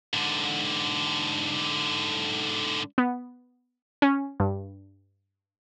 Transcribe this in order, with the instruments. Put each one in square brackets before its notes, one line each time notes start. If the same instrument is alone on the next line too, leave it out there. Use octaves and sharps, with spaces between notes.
[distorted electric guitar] G#2 D3
[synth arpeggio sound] B3
C#4
G2